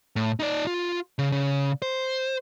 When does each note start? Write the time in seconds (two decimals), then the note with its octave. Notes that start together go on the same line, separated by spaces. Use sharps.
0.16 A2
0.40 D#4 D5
0.67 F4
1.19 C#3
1.32 C#3
1.82 C5